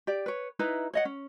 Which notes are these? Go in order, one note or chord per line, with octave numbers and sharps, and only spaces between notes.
G4 D5
B4 C#5
D#4 E4 B4 A#5
C#5 D#5 F#5
C#4